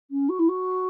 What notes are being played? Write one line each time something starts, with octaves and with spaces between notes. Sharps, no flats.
C#4
F#4
E4
F#4